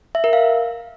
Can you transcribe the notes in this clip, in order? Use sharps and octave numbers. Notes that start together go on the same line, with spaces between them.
E5
A#4
F5